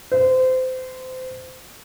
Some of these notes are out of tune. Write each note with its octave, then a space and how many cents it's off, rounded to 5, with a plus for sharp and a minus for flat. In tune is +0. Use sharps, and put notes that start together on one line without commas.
C5 -25